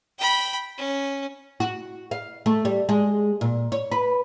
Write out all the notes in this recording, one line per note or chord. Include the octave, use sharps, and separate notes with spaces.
G5 B5
C#4
F#4
F5
A3
G3
G#3
A#2
C#5
B4